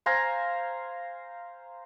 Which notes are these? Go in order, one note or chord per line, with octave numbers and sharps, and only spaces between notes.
C5 F5 G#5 A#5